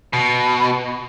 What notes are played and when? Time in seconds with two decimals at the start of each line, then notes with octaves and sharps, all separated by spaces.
0.13 B2